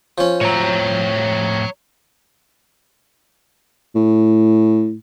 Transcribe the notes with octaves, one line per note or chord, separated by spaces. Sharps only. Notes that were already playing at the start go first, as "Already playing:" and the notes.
F3 C#4
A2 C4 C#5 A#5
A2